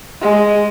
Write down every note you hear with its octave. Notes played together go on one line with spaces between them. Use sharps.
G#3